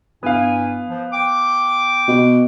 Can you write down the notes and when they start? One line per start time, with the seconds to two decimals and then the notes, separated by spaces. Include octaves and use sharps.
0.23 G2 B3 E4 F5 G#5
0.88 F3
1.12 G5 D6
2.08 B2